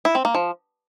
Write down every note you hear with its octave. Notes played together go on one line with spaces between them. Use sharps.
E4
C4
A#3
F3